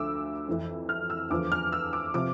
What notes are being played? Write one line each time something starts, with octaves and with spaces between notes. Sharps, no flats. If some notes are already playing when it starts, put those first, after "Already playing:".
Already playing: D2 D3 F3 D6 E6
F2 E3
F6
E6
E2 D3 F3 D6
F6
E6
D6
C3 F3 D6